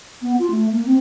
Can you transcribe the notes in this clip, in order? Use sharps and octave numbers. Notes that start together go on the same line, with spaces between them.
B3
F4
A3
A#3
C4